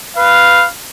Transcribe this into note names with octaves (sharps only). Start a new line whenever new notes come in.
B4 F5